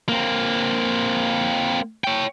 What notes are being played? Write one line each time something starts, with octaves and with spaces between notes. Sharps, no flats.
A#3 C4
C#5 G5